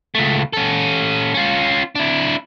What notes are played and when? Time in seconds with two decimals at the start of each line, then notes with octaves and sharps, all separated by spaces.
0.15 C#2 A3
0.53 C#4 A4
1.34 C#4 F4
1.95 D4 E4